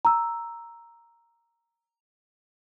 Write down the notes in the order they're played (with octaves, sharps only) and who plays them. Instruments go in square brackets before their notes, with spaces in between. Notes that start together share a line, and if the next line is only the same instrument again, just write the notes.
[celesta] A#5 E6